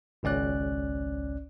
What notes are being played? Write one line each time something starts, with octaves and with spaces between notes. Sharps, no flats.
G#1 C#2 C#4 D5 F#6